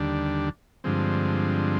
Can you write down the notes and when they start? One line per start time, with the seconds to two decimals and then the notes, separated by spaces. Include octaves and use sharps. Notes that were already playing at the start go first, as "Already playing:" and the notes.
Already playing: D#2 D3 G3 D4
0.84 G2 D3 F3 G#3 C4